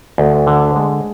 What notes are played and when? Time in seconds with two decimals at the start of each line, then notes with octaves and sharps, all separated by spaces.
0.18 D2
0.47 D3
0.76 G#3